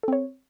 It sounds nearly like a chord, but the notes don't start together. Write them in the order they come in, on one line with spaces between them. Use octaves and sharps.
A4 C4 C#5